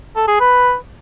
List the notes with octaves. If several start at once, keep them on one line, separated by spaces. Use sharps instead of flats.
A4
G#4
B4